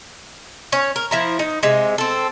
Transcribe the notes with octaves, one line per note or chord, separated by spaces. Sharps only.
C#4 C#5
A#4
F3 E4 A#5
D#4
C3 G#3
C4 A4